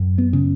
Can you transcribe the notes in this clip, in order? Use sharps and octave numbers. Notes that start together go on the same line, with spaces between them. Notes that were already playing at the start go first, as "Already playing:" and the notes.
Already playing: F#2
B3
C#3